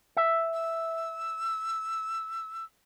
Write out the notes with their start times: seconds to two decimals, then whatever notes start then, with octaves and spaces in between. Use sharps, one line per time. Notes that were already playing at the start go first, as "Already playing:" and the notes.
0.17 E5
0.53 E6